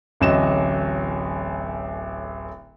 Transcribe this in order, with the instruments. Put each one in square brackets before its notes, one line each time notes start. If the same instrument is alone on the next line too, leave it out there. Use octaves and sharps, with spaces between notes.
[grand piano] D1 A1 F#3 D#5 E7